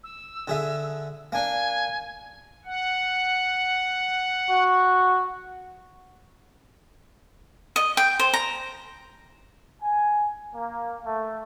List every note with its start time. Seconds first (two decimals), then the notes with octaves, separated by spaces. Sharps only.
0.03 E6
0.48 D3 G#4 E5
1.32 A#3 D4 G#5
2.65 F#5
4.51 F#4
7.76 D#5
7.97 G5
8.19 C5
8.34 A#5
9.82 G#5
10.55 A#3
11.05 A3